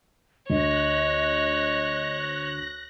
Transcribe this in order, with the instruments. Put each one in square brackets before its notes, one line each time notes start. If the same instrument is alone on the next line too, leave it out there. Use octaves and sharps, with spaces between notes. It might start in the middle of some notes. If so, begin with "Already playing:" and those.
[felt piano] D2 [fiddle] C#5 [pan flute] D#5 [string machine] F#6 A#6